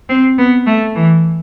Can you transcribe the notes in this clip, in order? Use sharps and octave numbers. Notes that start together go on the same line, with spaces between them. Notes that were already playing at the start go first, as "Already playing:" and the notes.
C4
B3
A3
E3